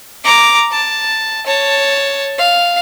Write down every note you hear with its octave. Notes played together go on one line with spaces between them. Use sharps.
A#5 D6
A5
C#5 A5
F5